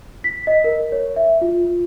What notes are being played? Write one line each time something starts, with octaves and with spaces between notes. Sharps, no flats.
B6
D#5
A#4
C#5
E5
F4